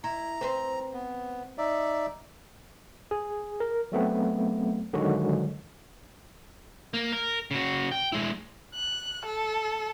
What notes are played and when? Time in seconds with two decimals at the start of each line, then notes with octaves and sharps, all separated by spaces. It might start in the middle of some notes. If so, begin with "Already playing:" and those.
0.04 E4 A#5
0.41 C4 B4 C5
0.94 B3
1.58 D#4 D5 E5
3.11 G#4
3.60 A#4
3.92 F#3 A3 B3 C4
4.93 D3 D#3 F3 F#3 G#3 F#4
6.94 A#3
7.12 A#4
7.51 C#3 F#4
7.92 G5
8.12 G#3 E4
8.75 F#6
9.25 A4